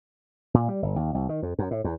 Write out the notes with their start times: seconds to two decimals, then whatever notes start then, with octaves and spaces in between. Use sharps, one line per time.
0.54 A#2
0.69 G3
0.82 G1
0.96 D#2
1.15 C2
1.29 D#3
1.42 F2
1.59 F#2
1.71 A2
1.84 E2